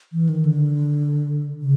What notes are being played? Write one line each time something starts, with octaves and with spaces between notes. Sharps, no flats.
E3
D#3
D3
C#3